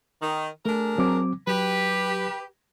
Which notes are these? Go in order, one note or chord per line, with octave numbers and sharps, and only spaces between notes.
D#3
A3 D4 G#4 A#4
F#3 C4 D6
F#3 G4 B4